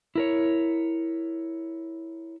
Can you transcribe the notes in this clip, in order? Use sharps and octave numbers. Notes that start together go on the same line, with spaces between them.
E4 A#4 C#5